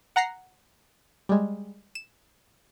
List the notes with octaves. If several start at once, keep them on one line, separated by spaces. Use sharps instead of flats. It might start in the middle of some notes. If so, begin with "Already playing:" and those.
F#5 A#5 A#6 C7
G3 G#3
E7